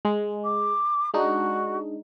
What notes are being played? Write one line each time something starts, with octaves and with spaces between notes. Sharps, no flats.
G#3
D6
G#3 D4 D#4 F#4